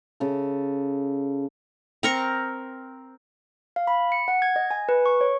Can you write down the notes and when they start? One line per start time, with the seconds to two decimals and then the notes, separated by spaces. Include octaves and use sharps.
0.20 C#3 A4
2.03 C4 A#4 C#6
3.76 F5
3.87 B5
4.12 C#7
4.28 F#5
4.42 G#6
4.56 D#5
4.71 G#5
4.89 B4
5.06 C#6
5.21 C#5